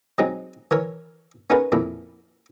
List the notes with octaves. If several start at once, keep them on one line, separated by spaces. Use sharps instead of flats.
F#3 G#3 C4 D#4
E3 A#4 C#5
B3 C#4 D#4 G#4 A#4 B4
F2 A#2 E4